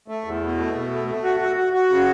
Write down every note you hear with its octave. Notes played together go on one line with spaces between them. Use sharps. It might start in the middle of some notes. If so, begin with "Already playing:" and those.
A3
E2
B2
A3
B2
A3
A3
F#4
F#4
F#4
F#4
C#3